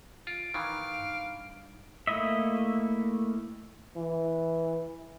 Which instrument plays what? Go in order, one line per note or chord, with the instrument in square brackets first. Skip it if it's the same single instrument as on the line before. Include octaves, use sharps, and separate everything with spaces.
[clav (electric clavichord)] F4 [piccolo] D7
[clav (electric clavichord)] D#3 E3 [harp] D#4 [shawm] F5
[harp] G2
[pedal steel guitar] A3 A#3 E4 D#5 E5
[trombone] E3